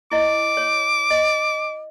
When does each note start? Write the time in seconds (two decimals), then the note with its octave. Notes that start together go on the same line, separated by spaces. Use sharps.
0.12 E4 D#5 D6
0.57 C#5
1.10 D#5